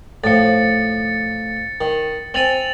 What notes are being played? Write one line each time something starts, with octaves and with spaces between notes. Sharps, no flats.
A2 F3 A6 C#7
D#3
C4 G#5 A6 F7 F#7